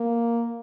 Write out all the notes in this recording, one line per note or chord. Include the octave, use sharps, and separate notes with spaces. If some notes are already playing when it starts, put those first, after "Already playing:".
Already playing: A#3